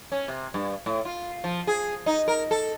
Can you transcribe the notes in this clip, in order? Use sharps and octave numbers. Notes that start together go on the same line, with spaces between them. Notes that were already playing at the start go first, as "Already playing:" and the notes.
C#4
C3
G2
A2
F4
F3
G#4
D#4
A#4
A4